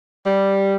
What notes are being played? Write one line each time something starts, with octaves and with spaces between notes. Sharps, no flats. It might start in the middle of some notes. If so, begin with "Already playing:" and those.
G3